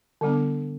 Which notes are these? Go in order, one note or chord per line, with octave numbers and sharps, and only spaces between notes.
D3 G3 B3 D4